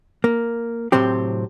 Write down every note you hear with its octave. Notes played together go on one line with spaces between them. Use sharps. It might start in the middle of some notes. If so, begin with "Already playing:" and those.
A#3
A2 C3 F#3 C4 G4